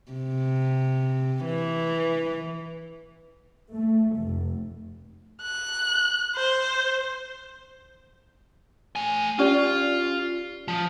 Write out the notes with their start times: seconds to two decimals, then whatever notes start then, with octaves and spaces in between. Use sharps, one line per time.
0.12 C3
1.46 E3
3.73 A3
4.18 F1
5.42 F#6
6.36 C5
8.96 A3 G#5
9.39 C#4 F4 G4 D5
10.68 F3